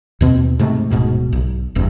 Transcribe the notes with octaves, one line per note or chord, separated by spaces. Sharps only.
D#2 B2 C4
G#2 C3 A3
D1 A#1 G#2 B2
B1
F#1 E2 G2